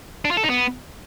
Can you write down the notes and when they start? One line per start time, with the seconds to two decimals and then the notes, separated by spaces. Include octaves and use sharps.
0.25 D4
0.31 F4
0.37 A4
0.44 D#4
0.50 B3